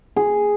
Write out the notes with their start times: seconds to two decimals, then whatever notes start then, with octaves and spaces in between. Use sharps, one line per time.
0.16 G#4